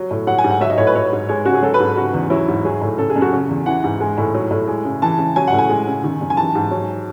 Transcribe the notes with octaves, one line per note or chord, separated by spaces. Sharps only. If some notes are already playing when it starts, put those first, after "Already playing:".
Already playing: F#3
A2
F#3 F#5
G#5
G#2
F#5
F#3 E5
D#5
A2 C#5
B4
F#3 C#5
G#2
G#3 C#5
C#3 F#4
G#4
F#3 A4
B4
G#2
C#3 F#4
E2
F#3 E4
G#2
F#3 G#4
A2
C#3 A4
G#4
F#2
F#4
C#3
E2
E3 F#5
G#2
G#3
A2
F#3
A2
G#3
C#3
E3 A5
C#3
F#3 G#5
A2 F#5
G#5
G#3
C#3
D#3
F#2
G#5
E3 A5
G#2
F#3